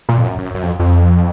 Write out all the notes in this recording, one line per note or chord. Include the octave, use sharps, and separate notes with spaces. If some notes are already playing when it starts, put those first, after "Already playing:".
A#2
F2
F#2
F#2
F#2
F2
F2